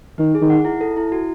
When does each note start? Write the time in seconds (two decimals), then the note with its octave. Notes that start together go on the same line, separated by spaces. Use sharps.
0.18 D#3 D#4
0.35 G#4
0.42 D#3
0.50 F#5
0.65 E4
0.81 A4
0.97 E4
1.12 F#4